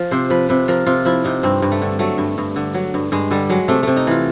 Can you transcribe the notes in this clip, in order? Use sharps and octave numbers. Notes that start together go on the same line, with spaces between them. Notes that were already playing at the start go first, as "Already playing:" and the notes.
Already playing: F3
C3 C5
F3 B4
C3 B4
F3 A#4
C3 F4
F3 E4
C3 D#4
G2 C4
G2
A3
D3
F#3 A3
G2
G2
D3
F#3
G2
G2 G#3
D3 G3
F#3 G#3
C3 A3
C3 A3
D#4
E3 F4